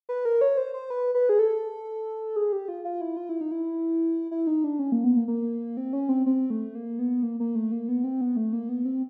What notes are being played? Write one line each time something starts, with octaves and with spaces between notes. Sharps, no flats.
B4
A#4
C#5
C5
C5
B4
B4
G#4
A4
G#4
G4
F4
F4
E4
F4
E4
D#4
E4
E4
D#4
D4
C#4
A#3
B3
A#3
A#3
C4
C#4
C4
C4
A3
A#3
B3
A#3
A#3
A3
A#3
B3
C4
B3
A3
A#3
B3
C4